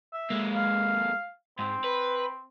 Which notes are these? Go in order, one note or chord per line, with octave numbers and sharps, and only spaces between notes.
E5
G#3 A#3
F5
G#2 C4
B4